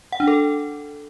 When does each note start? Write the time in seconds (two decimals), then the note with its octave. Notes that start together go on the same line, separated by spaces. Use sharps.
0.12 F#5
0.20 D4
0.27 A4